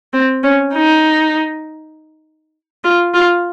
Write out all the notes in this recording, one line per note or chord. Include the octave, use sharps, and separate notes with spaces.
C4
C#4
D#4
F4
F4